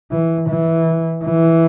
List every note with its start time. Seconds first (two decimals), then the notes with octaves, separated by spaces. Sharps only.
0.11 E3
0.49 E3
1.24 E3